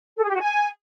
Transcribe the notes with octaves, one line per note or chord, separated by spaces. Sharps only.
A4
G#4
G4
F#4
G#5